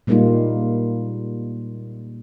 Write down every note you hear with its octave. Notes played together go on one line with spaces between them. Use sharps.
A#2 G3 G#3 A#3 D#4 F4